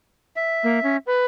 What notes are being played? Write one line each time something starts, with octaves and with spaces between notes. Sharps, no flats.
E5
A#3
C#4
B4